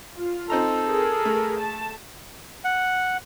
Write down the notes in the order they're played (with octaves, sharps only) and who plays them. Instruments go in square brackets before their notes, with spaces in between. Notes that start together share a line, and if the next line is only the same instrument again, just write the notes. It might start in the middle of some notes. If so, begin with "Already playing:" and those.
[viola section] F4
[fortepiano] C4 D#4 A#5 [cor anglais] A4
[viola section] G#4 A#4
[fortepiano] A3
[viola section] A5
[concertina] F#5